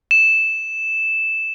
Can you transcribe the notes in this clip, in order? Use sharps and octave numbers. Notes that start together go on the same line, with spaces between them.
E7